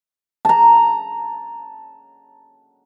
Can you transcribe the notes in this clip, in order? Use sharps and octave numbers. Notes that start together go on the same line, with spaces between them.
A5 A#5